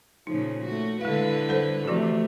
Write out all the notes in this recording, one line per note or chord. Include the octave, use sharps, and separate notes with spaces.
A#2 C#3 F3 D#4
A3 F#4
D3 G#3 E4 B4 F5
G3 A4 C5
C3 E3 F3 A3 F#4